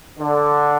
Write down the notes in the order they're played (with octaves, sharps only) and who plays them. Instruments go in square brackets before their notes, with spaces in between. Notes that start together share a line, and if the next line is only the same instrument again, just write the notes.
[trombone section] D3